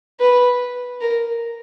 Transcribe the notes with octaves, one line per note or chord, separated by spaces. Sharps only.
B4
A#4